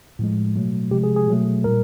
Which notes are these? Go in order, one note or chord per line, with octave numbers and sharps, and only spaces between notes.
A2 F3 G#3
B2 F#3 A3
C3 F3 G#3 G4
G#4
G#4
B2 F#3 A3
A#2 G3 A#4